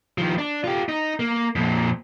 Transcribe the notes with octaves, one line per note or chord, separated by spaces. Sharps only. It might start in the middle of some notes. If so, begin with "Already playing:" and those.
D#3 F3
D4
F4 G4
D#4
A#3
F2 A#2